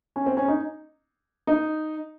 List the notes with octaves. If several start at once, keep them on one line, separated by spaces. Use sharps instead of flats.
C#4
C4
C#4
D#4
D#4